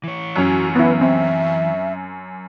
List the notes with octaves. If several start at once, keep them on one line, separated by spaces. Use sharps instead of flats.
E3 C#5
F#2 C#4 F#4
B3 E4 B4
C4 E5